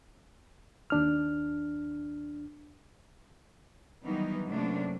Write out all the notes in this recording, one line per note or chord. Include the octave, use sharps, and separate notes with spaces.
D#2 D4 F6
D#3 E3 F#3 G3 B3 D#4
F#2 C3 A3 A#3 D4